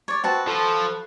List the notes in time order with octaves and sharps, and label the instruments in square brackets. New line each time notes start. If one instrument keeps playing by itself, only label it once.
[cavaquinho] C#5 D5
[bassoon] C4 [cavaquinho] F#4 B4 A5
[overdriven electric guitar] F3 [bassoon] A4